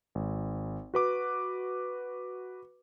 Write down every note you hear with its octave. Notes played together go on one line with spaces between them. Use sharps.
G#1
F#4 B4 D6